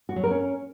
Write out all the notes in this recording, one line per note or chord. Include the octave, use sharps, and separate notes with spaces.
F#4
F#3
A#4
C#4